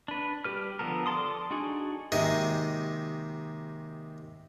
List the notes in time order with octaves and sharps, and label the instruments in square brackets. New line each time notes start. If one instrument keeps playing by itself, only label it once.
[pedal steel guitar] D4 B4
G3 G4 B4 F6
D3 F3 B3 A4 A#4
A4 D5 A5 C6 D#6
D4 D#4 F#4 G#4
[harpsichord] D#2 C3 D#3 G#3 F#4 D#5